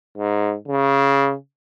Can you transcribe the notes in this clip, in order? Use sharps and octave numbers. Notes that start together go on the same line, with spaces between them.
G#2
C#3